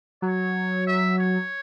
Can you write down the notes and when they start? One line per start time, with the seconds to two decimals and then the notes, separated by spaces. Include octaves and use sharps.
0.22 F#3 C#5
0.87 E5
1.18 C#5